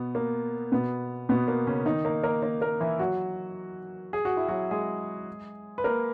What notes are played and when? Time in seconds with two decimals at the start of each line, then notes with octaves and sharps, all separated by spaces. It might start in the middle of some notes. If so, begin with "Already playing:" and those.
Already playing: B2 B3
0.15 A#3
0.72 B2 B3
1.29 B2 B3
1.48 A#3
1.67 C#3 C#4
1.86 D#3 D#4
2.05 A#3 A#4
2.23 A#3 A#4
2.43 A#3 A#4
2.61 A#3 A#4
2.80 E3 E4
2.99 F#3 F#4
4.13 G#4
4.25 F#4
4.37 E4
4.48 F#3 F#4
4.71 G#3 G#4
5.78 B4
5.84 A#3 A#4